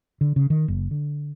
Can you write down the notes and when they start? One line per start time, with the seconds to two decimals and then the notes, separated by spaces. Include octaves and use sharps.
0.21 D3
0.36 C#3
0.50 D#3
0.68 F#1
0.91 D3